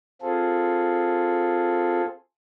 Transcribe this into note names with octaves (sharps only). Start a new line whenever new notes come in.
C4 F4 G#4 A4